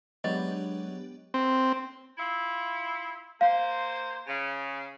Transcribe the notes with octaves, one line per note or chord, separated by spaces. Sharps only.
F#3 G#3 B3 D4 G4 D#5
C4
E4 F4 E5
A#3 C5 F5
C#3